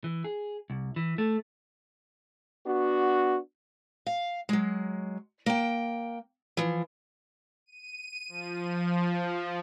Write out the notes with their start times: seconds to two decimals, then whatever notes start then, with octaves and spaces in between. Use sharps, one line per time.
0.04 E3
0.24 G#4
0.70 C2
0.96 E3
1.18 A3
2.67 B3 D4 F#4
4.06 F5
4.49 F#3 G#3
5.46 A#3 G5
6.57 E3 F3
7.66 D#7
8.29 F3